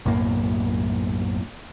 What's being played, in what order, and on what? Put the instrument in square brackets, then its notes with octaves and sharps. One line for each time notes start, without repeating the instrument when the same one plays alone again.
[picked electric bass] B1 F#2 A2 A#3